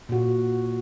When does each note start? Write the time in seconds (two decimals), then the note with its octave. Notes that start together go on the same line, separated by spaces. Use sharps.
0.09 A#2 F#4